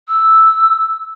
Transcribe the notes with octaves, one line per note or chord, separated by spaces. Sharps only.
E6